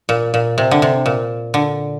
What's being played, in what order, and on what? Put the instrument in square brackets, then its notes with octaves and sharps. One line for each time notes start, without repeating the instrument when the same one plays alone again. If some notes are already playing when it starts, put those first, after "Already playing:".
[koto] A#2
A#2
C3
D3
C3
A#2
D3